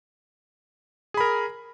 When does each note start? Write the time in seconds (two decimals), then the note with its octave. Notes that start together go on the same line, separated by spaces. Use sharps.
1.14 G#4
1.17 B5
1.20 A#4